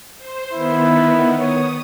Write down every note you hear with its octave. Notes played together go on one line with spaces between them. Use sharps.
C5
D#3 B3 E4
C#5 D#6